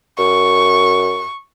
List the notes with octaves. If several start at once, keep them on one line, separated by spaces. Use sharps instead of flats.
F#2 C#6